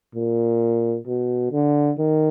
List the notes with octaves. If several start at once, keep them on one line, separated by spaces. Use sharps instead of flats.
A#2
B2
D3
D#3